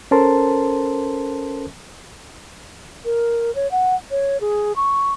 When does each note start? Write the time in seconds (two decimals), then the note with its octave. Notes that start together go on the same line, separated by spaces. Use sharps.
0.11 C#4 A4 A#4 C5 A5 C6
3.05 A#4
3.55 C#5
3.71 F#5
4.11 C#5
4.41 G#4
4.76 C#6